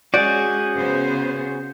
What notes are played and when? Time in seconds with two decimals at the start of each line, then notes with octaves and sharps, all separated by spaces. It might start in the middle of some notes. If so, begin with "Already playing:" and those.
0.14 G#3 C#4 F#4 G#4 D5 G6
0.76 C#3 B3 C5